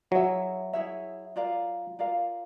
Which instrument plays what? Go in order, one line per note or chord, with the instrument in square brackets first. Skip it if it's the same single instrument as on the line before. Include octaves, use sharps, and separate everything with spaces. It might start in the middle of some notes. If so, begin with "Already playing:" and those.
[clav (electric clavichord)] F#3 [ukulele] E4 G#4 C#5 E5
[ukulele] E4 G#4 C#5 E5
F4 A#4 D5 F5
F4 A#4 D5 F5